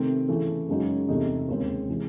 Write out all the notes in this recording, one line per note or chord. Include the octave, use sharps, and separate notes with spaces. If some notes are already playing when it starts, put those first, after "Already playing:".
Already playing: C3 D#3 A3 C4
C#3 E3 A3
F#2 C#3 G#3 D#4 F#4
E2 C3 E3 A3 D#4
D#2 C#3 G#3 C4
C3 E3 G#3